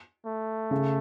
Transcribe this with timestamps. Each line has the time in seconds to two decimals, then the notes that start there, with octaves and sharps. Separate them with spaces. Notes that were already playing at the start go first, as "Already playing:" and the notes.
0.26 A3
0.71 C#3